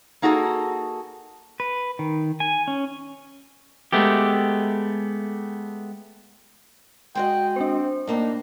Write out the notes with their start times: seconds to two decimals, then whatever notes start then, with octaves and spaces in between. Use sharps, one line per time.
0.22 A#3 D#4 F#4 G#4 A4
1.60 B4
1.99 D#3
2.40 G#5
2.68 C#4
3.92 G#3 A3 B3 G4
7.15 G#3 F#4 D#5 G5
7.56 C4 D4 C5
8.07 A2 A#3 D4 D#4